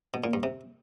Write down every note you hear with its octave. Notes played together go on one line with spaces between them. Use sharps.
B2
A#2
G2
C3